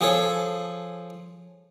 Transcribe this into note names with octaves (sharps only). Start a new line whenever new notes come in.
F3 G#4 A4 C#5